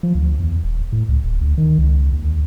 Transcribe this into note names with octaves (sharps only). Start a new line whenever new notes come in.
F3
D2
E2
D#1
A2
C#2
D1
D2
D#3
C#2
D#2